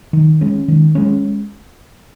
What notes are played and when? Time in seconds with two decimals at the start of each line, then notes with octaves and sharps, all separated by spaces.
0.13 D#3
0.41 G#3 C#4
0.68 D#3
0.95 G#3 C#4